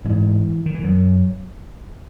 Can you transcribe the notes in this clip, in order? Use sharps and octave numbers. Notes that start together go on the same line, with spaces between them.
G#2 E3
D#3
E3
F#2 F#3